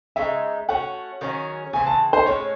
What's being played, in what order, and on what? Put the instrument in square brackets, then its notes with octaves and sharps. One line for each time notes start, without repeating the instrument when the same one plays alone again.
[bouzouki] C#3 G#3 D#4 [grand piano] E5
[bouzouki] A3 C#4 F#4 [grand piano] F#5
[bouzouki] D#3 F#3 C#4 G#4
[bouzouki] C#3 E3 C4 [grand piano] G#5
[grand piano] A5
C5
[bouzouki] A2 G#3 C#4 [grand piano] C#5